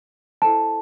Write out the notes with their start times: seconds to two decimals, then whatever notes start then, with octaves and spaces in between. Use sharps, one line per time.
0.42 E4 A4 C5 A5